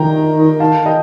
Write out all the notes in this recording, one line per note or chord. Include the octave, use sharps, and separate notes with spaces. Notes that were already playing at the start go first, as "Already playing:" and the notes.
Already playing: D#3 G5 A#5
F5 A5
D#5 G5